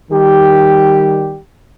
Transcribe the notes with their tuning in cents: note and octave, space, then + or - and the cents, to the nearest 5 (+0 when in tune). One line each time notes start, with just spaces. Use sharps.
D#3 -5 G3 +0 G4 +0